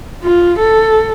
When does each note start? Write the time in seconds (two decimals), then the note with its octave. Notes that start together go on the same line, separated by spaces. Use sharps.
0.23 F4
0.58 A4